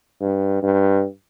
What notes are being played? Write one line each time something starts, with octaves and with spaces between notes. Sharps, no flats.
G2
G2